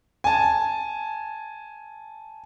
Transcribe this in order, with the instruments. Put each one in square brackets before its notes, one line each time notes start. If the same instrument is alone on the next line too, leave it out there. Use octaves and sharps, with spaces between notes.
[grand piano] G#5 A5